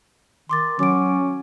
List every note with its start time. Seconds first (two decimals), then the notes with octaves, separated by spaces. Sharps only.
0.49 D#3 C6 D6 A6
0.79 F#3 C#4 D6 D7